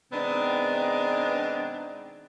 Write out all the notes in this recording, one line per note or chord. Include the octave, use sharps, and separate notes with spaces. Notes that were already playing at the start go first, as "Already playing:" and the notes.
B2 D#3 G#3 B3 C4 D4